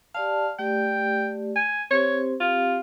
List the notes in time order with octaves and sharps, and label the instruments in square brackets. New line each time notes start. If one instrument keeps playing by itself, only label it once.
[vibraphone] G4 D5 A5 [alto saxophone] F5
[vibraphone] A3 G4 D5 [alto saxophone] G5
[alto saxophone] G#5
[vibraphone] C4 G4 C5 [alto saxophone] C#5
[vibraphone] C4 G4 F5 [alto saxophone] F4